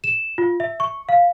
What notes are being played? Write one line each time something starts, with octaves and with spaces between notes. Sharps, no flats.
E7
F4
E5
C#6
F5